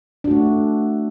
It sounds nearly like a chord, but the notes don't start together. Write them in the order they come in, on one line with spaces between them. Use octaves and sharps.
D4 F#4 A3